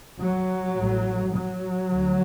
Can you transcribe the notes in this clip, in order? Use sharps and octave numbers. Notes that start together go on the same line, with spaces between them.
F#3
A1 A2
F#3
D2